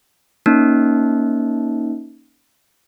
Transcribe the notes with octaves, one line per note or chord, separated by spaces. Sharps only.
A#3 C#4 D#4